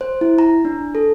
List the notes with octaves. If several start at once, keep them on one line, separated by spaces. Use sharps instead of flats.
C5
E4
A#5
D4
A4